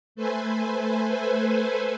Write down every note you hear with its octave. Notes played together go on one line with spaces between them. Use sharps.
A3 A4 B4 C5 G#5